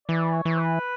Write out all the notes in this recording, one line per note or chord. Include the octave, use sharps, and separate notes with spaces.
E3 D5
C#5
E3
B4